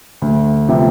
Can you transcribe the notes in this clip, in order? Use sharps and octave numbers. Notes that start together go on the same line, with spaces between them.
D2
C3 F3 B3